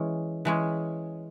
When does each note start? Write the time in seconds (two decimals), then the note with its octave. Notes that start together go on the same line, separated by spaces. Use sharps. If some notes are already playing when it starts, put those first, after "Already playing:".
Already playing: E3 G#3 C#4
0.45 E3 G#3 C#4